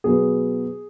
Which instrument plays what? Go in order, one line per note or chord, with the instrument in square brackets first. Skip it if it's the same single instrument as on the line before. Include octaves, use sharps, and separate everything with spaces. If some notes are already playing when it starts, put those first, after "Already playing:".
[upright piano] B2 F#3 B3 G#4